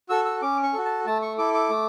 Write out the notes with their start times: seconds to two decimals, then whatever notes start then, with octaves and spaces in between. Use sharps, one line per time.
0.09 F#4 A4 E6
0.25 E6
0.42 C#4 D6
0.63 C#6
0.73 F#4 A4
0.85 A5
1.06 A3 A5
1.22 C#6
1.38 E4 A4 D6
1.54 D6
1.70 A3